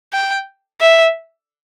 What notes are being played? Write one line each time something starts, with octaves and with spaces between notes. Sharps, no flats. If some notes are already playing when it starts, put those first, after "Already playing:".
G5
E5